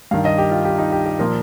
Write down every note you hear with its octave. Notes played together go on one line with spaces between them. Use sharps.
G2 D#3 F5
D#5
G4
F4
G4
D#4
G4
G4
A#2 F3 A#4